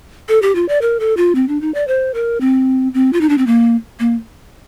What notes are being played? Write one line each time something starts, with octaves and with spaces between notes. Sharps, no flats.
A4
G4
F4
D5
A#4
A4
F4
C4
D4
D#4
D5
C5
A#4
C4
C4
F4
D#4
D4
C4
A#3
A#3